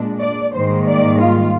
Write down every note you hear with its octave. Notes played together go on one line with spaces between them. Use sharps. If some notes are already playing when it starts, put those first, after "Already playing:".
Already playing: A#2 G#3 D4
D5
G#2 D#3 G3 A#3 C5
D5
F4